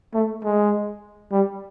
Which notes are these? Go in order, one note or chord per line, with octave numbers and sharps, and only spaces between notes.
A3
G#3
G3